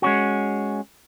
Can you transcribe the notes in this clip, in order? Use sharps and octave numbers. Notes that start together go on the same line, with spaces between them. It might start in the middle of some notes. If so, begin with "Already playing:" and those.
G#3 C#4 F#4